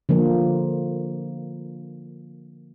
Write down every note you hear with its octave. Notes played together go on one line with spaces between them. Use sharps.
D3 F3 A#3